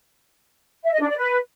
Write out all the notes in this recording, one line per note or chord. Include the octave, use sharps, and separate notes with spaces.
E5
D#5
D4
D5
B4